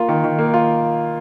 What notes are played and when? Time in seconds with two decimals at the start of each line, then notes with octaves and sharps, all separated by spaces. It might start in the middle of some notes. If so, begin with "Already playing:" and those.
Already playing: A#3 F4
0.09 D#3
0.24 D#3
0.39 A#3
0.54 F4